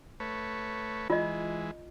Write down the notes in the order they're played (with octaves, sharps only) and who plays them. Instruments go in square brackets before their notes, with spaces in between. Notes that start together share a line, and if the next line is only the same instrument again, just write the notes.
[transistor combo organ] A3 B4 C#5
[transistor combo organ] E3 G#3 [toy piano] F4 D#5